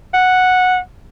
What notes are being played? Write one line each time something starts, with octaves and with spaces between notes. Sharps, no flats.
F#5